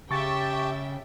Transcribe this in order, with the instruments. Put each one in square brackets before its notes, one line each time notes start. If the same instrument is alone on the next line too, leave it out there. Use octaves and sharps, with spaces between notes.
[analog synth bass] C#3 [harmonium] G4 A5 [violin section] E5 G5 [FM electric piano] C#6 A6